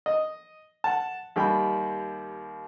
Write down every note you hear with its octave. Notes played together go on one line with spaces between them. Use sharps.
D#5
F#5 A5
D#2 G3 G5 B5